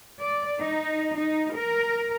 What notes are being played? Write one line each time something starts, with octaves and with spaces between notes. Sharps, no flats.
D5
D#4
D#4
A#4